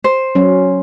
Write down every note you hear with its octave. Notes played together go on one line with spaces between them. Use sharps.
C5
F#3 C#4